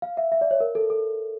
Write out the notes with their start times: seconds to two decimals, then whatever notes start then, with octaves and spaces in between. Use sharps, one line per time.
0.02 F5
0.17 E5
0.32 E5
0.41 D5
0.51 C#5
0.60 A#4
0.75 A4
0.90 A4